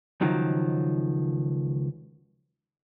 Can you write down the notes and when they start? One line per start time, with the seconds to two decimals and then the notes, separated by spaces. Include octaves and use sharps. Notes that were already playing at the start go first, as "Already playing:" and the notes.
0.21 C#2 D#3 F3 F#3